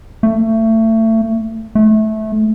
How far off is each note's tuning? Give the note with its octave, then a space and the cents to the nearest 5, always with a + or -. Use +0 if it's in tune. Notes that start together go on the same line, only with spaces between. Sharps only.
A3 +25
A3 -20